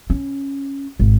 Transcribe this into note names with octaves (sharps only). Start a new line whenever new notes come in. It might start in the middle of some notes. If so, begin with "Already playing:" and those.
C#4
G#1